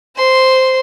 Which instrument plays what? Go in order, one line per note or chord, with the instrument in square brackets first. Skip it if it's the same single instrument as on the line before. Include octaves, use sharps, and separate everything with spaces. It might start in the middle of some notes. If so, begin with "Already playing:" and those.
[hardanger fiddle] C5 C6